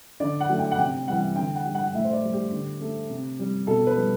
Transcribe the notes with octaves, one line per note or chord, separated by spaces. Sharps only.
D3 D5
F#5
F#3 A3
G5
F#5
C3 G5
E3 G3 F#5
D3 G5
F#5
G3
F#5
A2 E5
C5
D5
G3
G4
D3
A3
C3
G3
B2 A4
B4
G3